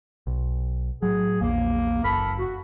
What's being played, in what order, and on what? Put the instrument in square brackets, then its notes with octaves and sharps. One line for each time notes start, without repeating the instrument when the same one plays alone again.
[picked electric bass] B1
[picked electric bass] A2 F#3 [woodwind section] G#4
[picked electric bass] A#1 E2 [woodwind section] A#3
[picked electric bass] F#1 [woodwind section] A4 A#4 B5
[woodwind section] F#4